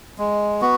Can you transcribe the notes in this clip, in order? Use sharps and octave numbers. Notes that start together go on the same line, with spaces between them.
G#3
B3 F#4